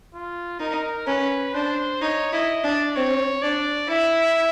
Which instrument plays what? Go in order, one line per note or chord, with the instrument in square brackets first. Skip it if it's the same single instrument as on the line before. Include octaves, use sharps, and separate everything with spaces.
[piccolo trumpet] F4
[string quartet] D#4 [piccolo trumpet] A#4
[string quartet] C#4 [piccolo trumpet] B4
[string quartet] D4 [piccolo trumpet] C5
[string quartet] D#4 [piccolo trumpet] C#5
[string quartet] E4 [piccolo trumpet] D#5
[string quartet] D4 [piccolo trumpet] D5
[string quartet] C4 [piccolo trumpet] C#5
[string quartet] D4 [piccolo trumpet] D5
[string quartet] E4 [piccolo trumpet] E5